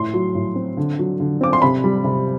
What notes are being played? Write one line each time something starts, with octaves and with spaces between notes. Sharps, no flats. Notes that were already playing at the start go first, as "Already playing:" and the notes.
Already playing: A2 C6
F#3
A2
C4
D3
F#3
D3
C4 D6
C6
C3 B5
G3
C3